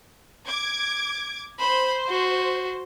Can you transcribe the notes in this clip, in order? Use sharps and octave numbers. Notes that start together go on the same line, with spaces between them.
D6 G#6
C5 B5
F#4